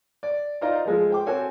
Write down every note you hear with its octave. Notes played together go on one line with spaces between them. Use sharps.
D5
D#4 F4 C5 D5 A#5
F3 G#3 A4
C5 G5 D6
C4 F#4 A4 C#5 G#5